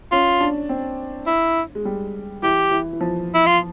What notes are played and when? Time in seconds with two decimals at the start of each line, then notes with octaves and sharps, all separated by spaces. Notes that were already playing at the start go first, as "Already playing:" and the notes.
0.12 C#4 F4
0.41 D4
0.69 C4
1.27 E4
1.75 G#3
1.85 G3
2.42 E3 G4
2.71 E3
2.93 E3
3.01 F3
3.34 E4
3.46 F4